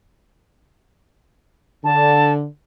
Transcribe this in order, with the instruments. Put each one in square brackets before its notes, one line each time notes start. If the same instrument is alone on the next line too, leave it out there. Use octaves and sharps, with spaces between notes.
[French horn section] D3 [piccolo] A5